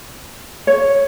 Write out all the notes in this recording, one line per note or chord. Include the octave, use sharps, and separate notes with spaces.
C#5